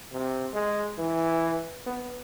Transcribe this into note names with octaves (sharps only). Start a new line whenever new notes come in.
C3
G#3
E3
B3